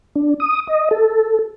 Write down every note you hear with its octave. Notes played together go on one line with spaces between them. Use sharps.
D4
D#6
D#5
A4